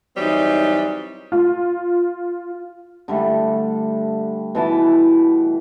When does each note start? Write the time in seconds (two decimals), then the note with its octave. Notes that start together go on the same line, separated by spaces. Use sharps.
0.16 E3 F#3 G3 C4 D#4
1.32 F4
3.08 D3 G3 A3
4.55 B2 E3 A5 B5